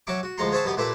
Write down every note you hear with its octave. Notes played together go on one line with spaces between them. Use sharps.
F#3 C#4 E5 C#6 D6
F#4
D2 F3 G#3 F#5 A#5 C6
G#4 C5 C#5 E5 F#5 A5
F#2 B2 B3 G4 G#5
A#2 A3 E4 G4 B4 E5